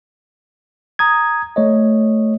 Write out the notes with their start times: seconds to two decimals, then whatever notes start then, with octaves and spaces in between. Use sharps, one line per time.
0.99 A#5 D#6 G#6
1.56 A3 C#5 D#5